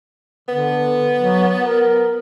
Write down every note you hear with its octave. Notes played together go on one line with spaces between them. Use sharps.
D3 B3
F#3
A#4